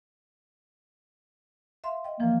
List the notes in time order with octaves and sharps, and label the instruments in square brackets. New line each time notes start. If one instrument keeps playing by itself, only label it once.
[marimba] E5 F5 C6
D#5 G5
[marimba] E3 F3 [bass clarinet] A#3